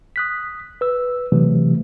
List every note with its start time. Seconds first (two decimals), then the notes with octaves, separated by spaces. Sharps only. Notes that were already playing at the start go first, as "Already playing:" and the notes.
0.16 D#6 F#6 B6
0.81 B4 E6
1.32 C3 E3 F#3 A3